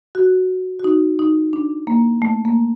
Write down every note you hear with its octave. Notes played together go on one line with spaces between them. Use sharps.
F#4
F#4
D#4
D#4
D4
A#3
A3
A#3